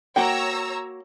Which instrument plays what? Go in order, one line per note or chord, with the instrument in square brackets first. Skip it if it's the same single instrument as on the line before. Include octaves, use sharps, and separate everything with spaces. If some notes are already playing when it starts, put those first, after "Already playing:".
[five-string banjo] A#3 F#4 G5 [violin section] C#5 A#5 E6